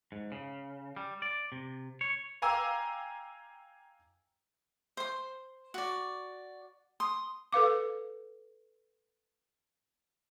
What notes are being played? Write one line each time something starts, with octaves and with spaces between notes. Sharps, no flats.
G#2
C#3
G3
D5
C3
C#5
F5 G5 G#5 A#5 D6 E6
C5 C6
F#4 D5
C6 D#6
A4 B4 F5 D6